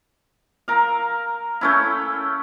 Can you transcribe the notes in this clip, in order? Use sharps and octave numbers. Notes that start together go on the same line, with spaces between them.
A#4 F5
A3 C#4 E4